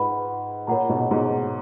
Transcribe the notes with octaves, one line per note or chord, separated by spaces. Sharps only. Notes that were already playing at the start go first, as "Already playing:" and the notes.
Already playing: G#2 F4 B4 F#5 B5
A#2 A#4 C#5 F#5 A#5
G#2 B2
A#2
G#2 B2